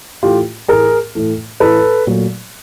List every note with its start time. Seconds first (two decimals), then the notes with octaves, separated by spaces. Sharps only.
0.23 A2 E3 A3 F4 G4
0.68 A2 E3 A3 G#4 A#4
1.15 A2 E3 A3
1.60 A2 E3 A3 A4 B4
2.07 A#2 F#3 A3